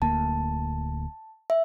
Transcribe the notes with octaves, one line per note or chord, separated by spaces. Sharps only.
D1 D2 A#3 A5
E5